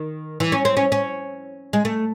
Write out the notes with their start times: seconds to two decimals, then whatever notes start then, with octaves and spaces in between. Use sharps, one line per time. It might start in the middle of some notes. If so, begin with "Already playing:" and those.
Already playing: D#3
0.40 E3
0.52 C#4
0.65 C4
0.77 C#4
0.92 C#4
1.73 G#3
1.85 A3